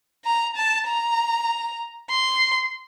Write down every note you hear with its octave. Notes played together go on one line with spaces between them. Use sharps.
A#5
A5
A#5
C6